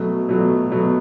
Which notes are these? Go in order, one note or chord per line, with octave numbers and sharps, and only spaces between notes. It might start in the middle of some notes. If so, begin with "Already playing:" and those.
Already playing: B2 F#3 A3
B2 F#3 A3
B2 F#3 A3